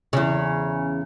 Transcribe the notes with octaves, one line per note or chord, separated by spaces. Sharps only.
E2 C#3